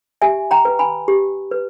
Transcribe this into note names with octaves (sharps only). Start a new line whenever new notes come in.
G4 E5 G#5
G5 A#5
B4
G#5 B5
G4
B4